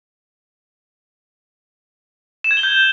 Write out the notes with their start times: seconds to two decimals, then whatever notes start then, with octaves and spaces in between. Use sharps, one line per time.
2.44 E7
2.51 G#6
2.57 G7
2.63 G6